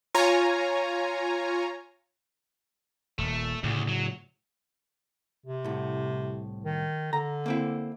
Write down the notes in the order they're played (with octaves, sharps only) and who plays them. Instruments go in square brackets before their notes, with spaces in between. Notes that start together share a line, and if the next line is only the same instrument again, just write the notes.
[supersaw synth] F4 C#5 G#5 A#5
[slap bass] D#1 [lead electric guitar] A3
[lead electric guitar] D2 [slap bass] A2 C#3 A3
[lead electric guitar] F#3
[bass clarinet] C3
[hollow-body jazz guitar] C2 A2
[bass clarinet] D#3
[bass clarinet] D3 [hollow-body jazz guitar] A#5
[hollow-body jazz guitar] A#3 C4 E4